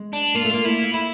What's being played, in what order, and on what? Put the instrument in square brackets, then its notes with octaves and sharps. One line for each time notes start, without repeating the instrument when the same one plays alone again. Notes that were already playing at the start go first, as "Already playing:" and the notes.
Already playing: [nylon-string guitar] G#3
[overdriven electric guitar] D4
[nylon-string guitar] A#3 [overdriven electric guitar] F4
[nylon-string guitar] A3
A#3
[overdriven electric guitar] E4
E4